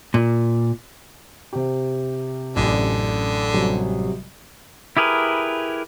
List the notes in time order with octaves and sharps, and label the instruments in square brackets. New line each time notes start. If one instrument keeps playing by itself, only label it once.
[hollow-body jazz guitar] A#2
[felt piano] C3 G4
[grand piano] A1 F#2 D5 [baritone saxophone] D3
[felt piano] C3 F#3 G3
[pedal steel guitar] E4 G4 G#4 A#4 B4